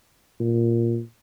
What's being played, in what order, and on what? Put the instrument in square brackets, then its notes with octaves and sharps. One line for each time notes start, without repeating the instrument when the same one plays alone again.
[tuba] A#2